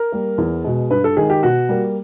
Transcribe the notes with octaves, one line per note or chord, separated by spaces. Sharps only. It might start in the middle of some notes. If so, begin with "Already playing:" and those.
Already playing: A#4
G3 A#3
E2
B2 G#3
G2 B4
A4
D#3 G#3 G#4
G4
B2 F#4
G3 A#3